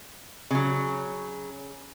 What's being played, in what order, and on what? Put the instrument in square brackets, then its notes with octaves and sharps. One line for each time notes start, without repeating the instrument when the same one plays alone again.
[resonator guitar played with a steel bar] C#3 F#3